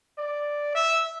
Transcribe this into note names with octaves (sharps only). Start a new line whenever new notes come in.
D5
E5